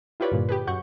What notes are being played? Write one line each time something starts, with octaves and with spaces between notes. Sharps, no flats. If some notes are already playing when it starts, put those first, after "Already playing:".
E4 F4 G4 B4 C#5 D5
G2 A#2 D3
G4 G#4 B4
F#2 F#4 F#5 C#6 G6